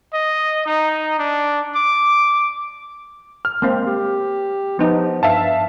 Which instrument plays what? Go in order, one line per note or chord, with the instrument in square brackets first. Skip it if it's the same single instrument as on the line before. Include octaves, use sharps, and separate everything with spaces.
[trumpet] D#5
D#4
D4
D6
[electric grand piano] F6
[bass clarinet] G#3 [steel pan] A#3 C4
[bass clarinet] G4
[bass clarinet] F3 [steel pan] B3 D#4
[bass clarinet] G2 [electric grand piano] E5 F5 A5